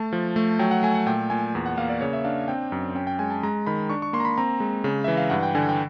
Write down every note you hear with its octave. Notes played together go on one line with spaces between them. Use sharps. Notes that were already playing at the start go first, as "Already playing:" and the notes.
Already playing: A3 A5
F3
A3
F#3 G5
F#5
A3 G#5
F#5
A#2 G5
A#2 G#5
E2
F#5
A#3 F5
D5
C#3 C#5
E5
D4 F5
C4 G5
F#2
C#4 G5
G5
G#3 G#5
A5
G#3 A#5
D#3 B5
D4 C#6
C#6
A#3 C6
A#5
B5
C4 A#5
G#3
C#3
E3 E5
F5
G2 F#5
G5
D3 G#5
G5